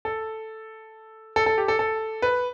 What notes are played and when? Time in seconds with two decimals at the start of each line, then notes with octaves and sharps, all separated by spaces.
0.05 A4
1.36 A4
1.46 A4
1.58 G4
1.68 A4
1.79 A4
2.22 B4